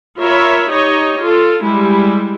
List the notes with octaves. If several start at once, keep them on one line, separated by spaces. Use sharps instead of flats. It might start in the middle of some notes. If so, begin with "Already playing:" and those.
F4 A#4 C#5 E5 B5
D#4 G4 C#5 D#5
F4 A4
G3 G#3 E4